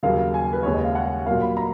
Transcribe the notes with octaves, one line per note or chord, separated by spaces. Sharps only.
D#2 C#3 F#3 A#3 F5
G#5
B4
D#2 C#3 G#3 C#5
D#5
F5
F#5
A#2 F#3 A#3 F5
B5
A#5